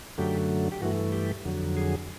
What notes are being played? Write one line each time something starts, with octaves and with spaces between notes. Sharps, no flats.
F#2 D3 F#3 A3 G4
G4
G2 E3 A3 F#4
G4
F2 D3 F#3
G#4